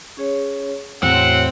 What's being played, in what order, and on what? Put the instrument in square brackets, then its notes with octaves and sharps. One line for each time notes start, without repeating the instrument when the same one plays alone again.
[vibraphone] C#4 G#4 C#5
[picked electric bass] E2 A2 [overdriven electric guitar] C4 [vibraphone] F#4 C#5 [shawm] F#5